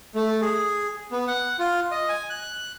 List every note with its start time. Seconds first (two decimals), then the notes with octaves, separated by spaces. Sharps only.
0.15 A3
0.41 G#4
1.12 B3
1.27 F#5
1.59 F4
1.91 D#5
2.09 G#5
2.30 F#6